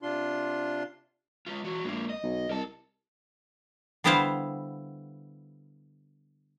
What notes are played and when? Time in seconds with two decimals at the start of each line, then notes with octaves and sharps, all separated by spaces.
0.03 C3 D4 F4 C6
1.47 G#3 F4
1.64 E3 F#4
1.84 A#1 G#3 A#3
2.10 D#5
2.23 B1
2.49 C2 A#4 A5
4.04 D3 G3 B3 E4 C5 F5